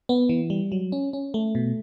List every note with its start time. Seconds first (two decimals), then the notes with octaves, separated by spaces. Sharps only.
0.09 B3
0.29 E3
0.50 G3
0.72 F#3
0.92 C#4
1.13 C#4
1.34 A3
1.55 B2